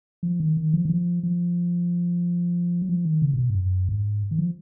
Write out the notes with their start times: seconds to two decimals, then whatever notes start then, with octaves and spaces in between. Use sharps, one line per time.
0.23 F3
0.40 D#3
0.57 D#3
0.74 F3
0.85 D#3
0.90 F3
1.23 F3
2.82 F#3
2.89 F3
3.05 D#3
3.22 C#3
3.33 A#2
3.38 B2
3.50 G#2
3.55 F#2
3.89 G#2
4.31 D#3
4.39 F3